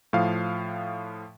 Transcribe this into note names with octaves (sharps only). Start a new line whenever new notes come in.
A2 F3 F5